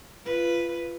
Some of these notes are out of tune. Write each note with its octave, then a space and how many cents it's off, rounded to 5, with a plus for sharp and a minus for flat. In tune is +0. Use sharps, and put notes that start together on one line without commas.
F4 -25 B4 +0